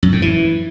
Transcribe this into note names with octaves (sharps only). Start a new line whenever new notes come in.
F#2
A2
E3